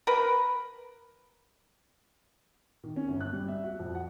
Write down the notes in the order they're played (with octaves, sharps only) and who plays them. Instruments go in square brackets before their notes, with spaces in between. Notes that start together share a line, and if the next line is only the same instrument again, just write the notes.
[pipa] A#4 B4
[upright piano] D#3
C#4
G1
F#6
G3
E5
F#4
F2
F#5